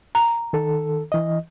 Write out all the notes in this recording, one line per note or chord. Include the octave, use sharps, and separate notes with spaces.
A#5
D#3 A4
E3 D#5